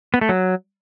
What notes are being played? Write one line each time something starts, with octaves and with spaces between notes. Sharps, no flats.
B3
A3
F#3